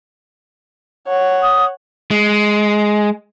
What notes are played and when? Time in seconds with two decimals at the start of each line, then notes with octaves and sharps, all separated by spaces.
1.07 C#5 F#5
1.43 D#6
2.11 G#3